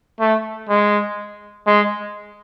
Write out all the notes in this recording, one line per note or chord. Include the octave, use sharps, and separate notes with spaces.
A3
G#3
G#3